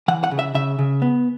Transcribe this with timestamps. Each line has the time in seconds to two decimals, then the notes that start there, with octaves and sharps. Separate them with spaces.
0.08 E3 F#5
0.24 F#5
0.31 C#3
0.39 E5
0.54 C#3 E5
0.79 C#3
1.02 B3